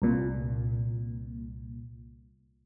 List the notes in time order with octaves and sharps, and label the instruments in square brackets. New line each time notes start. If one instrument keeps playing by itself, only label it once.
[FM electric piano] C2 A#2